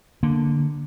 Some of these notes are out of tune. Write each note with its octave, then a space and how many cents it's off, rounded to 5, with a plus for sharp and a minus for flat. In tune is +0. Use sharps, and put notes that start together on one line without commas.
D3 +0 A#3 +0